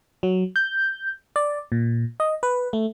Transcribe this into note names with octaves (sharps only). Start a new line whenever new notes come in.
F#3
G6
D5
A#2
D#5
B4
A3